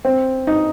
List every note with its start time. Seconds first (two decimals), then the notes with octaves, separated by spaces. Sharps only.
0.05 C4
0.47 D#4